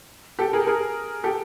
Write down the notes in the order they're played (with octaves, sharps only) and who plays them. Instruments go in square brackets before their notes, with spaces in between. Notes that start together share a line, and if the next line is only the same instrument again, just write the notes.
[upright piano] G4 A4
G#4 A#4
G#4 A#4
G4 A4